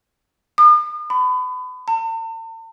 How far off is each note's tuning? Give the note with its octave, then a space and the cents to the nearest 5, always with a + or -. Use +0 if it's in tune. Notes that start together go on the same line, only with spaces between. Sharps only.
D#6 -45
B5 +35
A5 +45